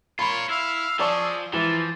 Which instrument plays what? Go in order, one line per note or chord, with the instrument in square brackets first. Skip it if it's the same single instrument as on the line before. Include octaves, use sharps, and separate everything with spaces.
[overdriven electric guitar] F4 A#4 [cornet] C#5 [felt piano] B5 C6
[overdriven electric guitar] E4 [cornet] F5 [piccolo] E6
[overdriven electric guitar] F3 [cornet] G#4 [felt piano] D5 A5 C#6
[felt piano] E3 [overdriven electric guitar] F3 [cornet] A#3 [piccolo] A6